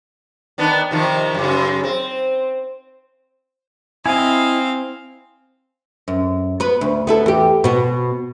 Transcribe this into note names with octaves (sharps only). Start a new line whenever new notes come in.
D#3 B3 D4
C3 D#3 F3
F#2 C#3
C4
C4 E4 D#5 F5 G#5
F#2
B3 B4
D2
B3 E4 A4
E2 G4
B2 B3